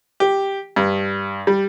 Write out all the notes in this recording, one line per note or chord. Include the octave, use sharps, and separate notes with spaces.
G4
G2
G3